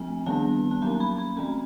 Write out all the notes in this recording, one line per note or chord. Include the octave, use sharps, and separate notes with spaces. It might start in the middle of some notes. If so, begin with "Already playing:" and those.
Already playing: F3 A3 C4 G#5
D#3 G3 B3 D4 A5
A5
F#3 A#3 C#4 A#5
B5
B5
E3 A3 C4 A#5